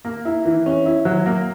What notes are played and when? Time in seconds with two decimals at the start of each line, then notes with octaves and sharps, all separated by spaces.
0.05 A#3
0.25 E4
0.45 E3
0.66 C#4
0.86 E4
1.05 F#3
1.26 A#3